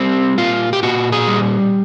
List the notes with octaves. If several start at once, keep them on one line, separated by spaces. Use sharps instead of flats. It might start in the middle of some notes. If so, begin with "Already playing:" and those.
Already playing: G3 C4
A#2 F4
G4
A#2 F#4
G#4
G3